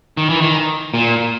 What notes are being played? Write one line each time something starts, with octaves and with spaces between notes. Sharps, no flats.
D#3
E3
D#3
A#2